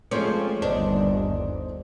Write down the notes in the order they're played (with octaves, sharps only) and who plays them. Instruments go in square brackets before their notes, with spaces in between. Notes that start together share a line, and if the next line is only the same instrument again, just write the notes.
[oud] F3 C4 C#4 [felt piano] G#3 A3 D6
[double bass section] G1 D#2 [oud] D4 [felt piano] C5 D#5